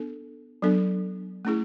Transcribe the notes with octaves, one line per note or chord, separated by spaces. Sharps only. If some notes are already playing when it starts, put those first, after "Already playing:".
Already playing: B3 D4 A4
F#3 B3 D4 A4
A3 C#4 E4 G#4